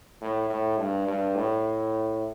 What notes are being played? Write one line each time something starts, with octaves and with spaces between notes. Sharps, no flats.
A2
A2
G2
G2
A2